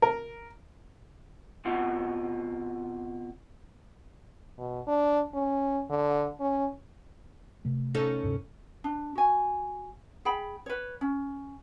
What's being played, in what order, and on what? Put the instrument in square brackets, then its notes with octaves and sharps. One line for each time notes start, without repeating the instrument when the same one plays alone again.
[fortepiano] A#4
[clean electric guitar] B2 C4 F4 F#5
[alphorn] B2
D4
C#4
D3
C#4
[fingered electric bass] C3 A3
[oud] C#4 D#4 A4
[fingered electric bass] D1 G2 C3
[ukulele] D4
F#4 G#5
G#4 G5 B5
B4 C#5
C#4